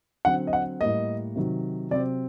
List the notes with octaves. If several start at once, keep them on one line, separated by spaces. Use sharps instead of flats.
D3 F#3 C4 F#5
D#5
F#5
A2 G3 A#3 D#5
C3 D#3 F#3
C3 F#3 C4 D5